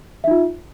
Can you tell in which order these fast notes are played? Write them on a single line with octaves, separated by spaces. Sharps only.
E5 D#4 F4